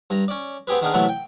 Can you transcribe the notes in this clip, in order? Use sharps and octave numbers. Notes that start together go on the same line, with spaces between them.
G2 A#5
C#4 D5
B3 C4 G4 G#4 B4
D#3 B3 D4 G#4 D#5 F5
A2 C3 E3 F#3 A3 B3
G5